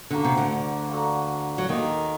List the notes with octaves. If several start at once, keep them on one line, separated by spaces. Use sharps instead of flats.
D3 A#3 F#4 A4
C3
D2 D3
A#3 F#4 A4
F#3
D#2 D#3 A#3 D#4 A4 D#5